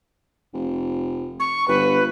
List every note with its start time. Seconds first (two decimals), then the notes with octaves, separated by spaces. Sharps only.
0.53 F1
1.39 C#6
1.68 G1 B4